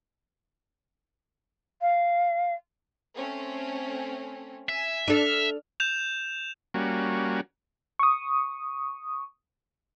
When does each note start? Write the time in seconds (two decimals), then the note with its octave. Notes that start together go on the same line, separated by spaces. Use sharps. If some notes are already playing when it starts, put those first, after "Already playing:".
1.81 F5
3.15 A3 C4 C#4
4.69 E5 G#5
5.08 D4 A4 F6
5.80 G6 E7 F7
6.74 G3 A#3 C#4 F#4
7.99 C#6 D#6